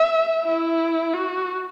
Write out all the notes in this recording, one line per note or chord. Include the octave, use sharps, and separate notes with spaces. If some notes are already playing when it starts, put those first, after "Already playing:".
Already playing: E5
E4
F#4